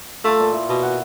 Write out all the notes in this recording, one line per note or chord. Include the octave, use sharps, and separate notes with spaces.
A3 F4 A4
A#2 C#6
E4
B2
F#5